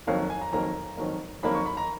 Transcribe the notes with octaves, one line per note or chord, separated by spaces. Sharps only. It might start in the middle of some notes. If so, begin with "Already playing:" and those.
F2 D#3 F#3 A#3 F5
G#5
A#5
F2 D#3 F#3 A#3 A#5
F2 D#3 F#3 A#3
F2 D#3 F#3 A#3 B5
C#6
B5
A#5